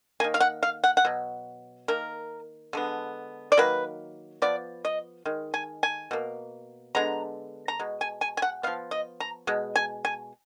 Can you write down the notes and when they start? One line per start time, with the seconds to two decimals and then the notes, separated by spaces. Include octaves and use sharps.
0.20 A#3 G#5
0.24 D#3
0.34 F5
0.40 F#5
0.63 F5
0.84 F#5
0.97 F#5
1.05 B2 F#3
1.88 D#3 A#3 A#4
2.73 D3 G#3 B3
3.52 D5
3.57 D#3 F#3 A#3 B4
4.42 F3 B3 D5
4.85 D#5
5.25 D#3 G#3
5.54 G#5
5.83 G#5
6.11 B2 A#3
6.95 D3 G#3 B3 A#5
7.68 A#5
7.79 B2 G#3
8.01 G#5
8.21 G#5
8.37 G#5
8.42 F#5
8.63 F3 B3 F5
8.91 D#5
9.20 A#5
9.47 B2 G#3
9.76 G#5
10.05 G#5